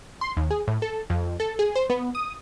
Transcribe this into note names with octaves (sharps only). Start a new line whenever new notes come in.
C6
D#2
G#4
A2
A4
F2
A4
G#4
C5
B3
D#6